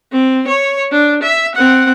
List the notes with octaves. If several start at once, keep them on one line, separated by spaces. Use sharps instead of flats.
C4
C#5
D4
E5
C4 F#5